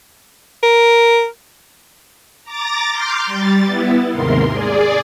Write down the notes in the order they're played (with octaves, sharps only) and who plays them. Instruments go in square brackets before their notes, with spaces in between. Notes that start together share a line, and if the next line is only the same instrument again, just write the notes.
[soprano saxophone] A#4
[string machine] A#5 D6 A6 A#6
C6 D6 F6 G6
G3 A6
B3 E4
D#2 G#2 C3 A#4 C6
G#4 D5